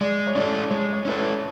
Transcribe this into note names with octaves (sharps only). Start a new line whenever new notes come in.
G#3 D5
C#5
C#4 E4 A4 D5
G#3 C#5
C#5
C#4 E4 A4 B4
C#5